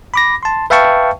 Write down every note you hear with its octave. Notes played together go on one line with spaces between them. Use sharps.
B5 D6 A#6
A5 C6
B4 E5 F5 G5 A5 C#6